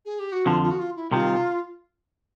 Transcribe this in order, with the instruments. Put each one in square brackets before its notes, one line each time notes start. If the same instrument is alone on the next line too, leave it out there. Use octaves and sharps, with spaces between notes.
[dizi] G#4
G4
F#4
[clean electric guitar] F2 D3 F3 [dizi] F4
[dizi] F4
F#4
F4
E4
[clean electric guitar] C2 C3 D#3 [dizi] F4